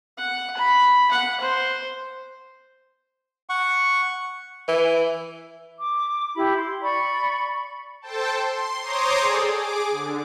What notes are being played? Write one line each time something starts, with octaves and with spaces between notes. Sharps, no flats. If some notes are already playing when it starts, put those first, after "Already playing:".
F#5
B5
F#5
C5
F#5 C#6
E3
D6
E4 G4 B5
C6
D5 B5 C#6
A4 C5 G5 A5
C6
C5 C#5 A#5 C6 D6 D#6
G#4 A4 D5 G5
G#4 D6
D3